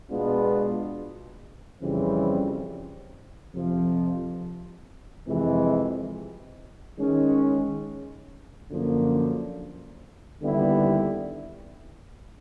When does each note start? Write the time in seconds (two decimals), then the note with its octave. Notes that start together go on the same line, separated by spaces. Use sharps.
0.11 B2 G#3 B3 D4 F4
1.82 F2 C#3 E3 G3 C4
3.54 F2 C3 F3
5.27 F2 C3 E3 G#3
6.98 D#3 G#3 C#4
8.70 F#2 D3 F3 A#3
10.42 D#2 D3 G3 B3 E4